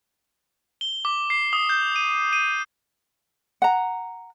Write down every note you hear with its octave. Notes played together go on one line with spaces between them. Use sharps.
G7
D6
C7
D#6
G6
D#7
D#7
F#5 A#5